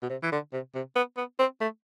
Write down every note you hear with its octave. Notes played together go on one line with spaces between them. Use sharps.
B2
C3
E3
D3
C3
C3
B3
B3
C4
A3